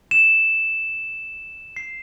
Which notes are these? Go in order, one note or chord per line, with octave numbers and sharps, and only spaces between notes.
E7
C7